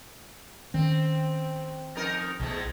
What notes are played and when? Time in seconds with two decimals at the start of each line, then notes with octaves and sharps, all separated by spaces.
0.74 D#3 C4 C#4
1.96 F2 D#4 A#4
2.40 B1 E2 G#3 A3